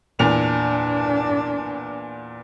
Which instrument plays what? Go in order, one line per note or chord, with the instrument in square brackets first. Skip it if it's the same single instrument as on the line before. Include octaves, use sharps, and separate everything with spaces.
[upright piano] E2 A#2 F7 [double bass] D4